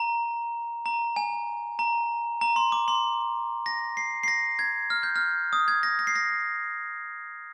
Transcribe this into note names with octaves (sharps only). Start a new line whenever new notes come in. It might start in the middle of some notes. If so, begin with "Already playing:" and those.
Already playing: A#5
A#5
G#5
A#5
A#5
C6
D6
C6
A#6
C7
C7
A#6
G#6
F6
G6
F6
D#6
G#6
A#6
A#6
C7
A#6